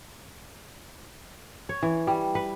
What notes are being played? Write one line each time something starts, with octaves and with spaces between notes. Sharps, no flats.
C#5
E3
G3
B4